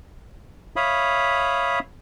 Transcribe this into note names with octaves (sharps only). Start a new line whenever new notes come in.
C#5 E5 F5 B5 D#6